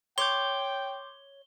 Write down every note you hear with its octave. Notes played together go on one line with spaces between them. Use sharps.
C#5 G5 C6 D6 G6 G7